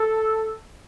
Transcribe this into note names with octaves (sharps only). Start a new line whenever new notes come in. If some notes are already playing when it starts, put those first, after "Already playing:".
Already playing: A4